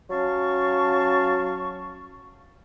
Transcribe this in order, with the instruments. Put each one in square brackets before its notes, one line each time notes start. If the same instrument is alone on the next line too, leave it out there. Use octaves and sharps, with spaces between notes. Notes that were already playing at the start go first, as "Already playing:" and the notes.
[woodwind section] F#3 C#4 F5 A5 C#6